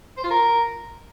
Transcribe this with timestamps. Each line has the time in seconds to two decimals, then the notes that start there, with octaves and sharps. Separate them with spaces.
0.17 C5
0.24 F4
0.30 A#4